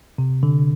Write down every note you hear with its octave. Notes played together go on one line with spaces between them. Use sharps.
C3
D3